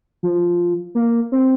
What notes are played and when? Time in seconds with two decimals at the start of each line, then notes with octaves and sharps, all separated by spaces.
0.23 F3
0.95 A#3
1.32 C4